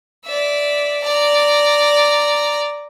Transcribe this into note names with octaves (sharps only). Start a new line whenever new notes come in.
D5 E5
D5 A#5